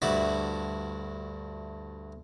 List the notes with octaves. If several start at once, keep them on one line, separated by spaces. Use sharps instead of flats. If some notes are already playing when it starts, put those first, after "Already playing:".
D2 G2 E4 F#4 D5 E5